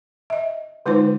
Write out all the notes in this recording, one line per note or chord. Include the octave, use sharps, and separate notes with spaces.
D#5 E5
D3 G#3 D#4 F4 B4 C5